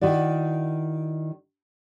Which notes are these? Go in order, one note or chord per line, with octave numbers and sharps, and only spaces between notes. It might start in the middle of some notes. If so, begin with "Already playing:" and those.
D#3 E4 F#4 D5